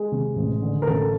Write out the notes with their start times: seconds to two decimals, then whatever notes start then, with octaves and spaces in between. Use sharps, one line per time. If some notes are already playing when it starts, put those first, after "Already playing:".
Already playing: G#3 G#4
0.12 C3
0.36 A1
0.62 D3
0.82 A#4
0.87 A1 A3 A4